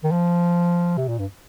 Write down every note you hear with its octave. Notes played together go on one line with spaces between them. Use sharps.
D#3
F3
C3
A#2
G2